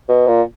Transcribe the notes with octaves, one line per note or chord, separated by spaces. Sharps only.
B2
A#2